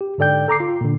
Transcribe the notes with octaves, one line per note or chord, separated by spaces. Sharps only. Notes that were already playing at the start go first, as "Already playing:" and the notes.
G4
G#2 D3 A4 D5 G5 G6
A4 A#5 D6 C7
F4
A#2 D3